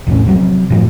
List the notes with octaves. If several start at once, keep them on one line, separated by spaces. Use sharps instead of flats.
A#1 E2 A2 C#4
C3 F3 F#3 C4
F#2 A2 F3